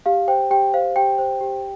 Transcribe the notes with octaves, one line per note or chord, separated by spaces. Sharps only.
G4 F5
C5 G5
G4 G5
C5 F5
G4 G5
C5
G4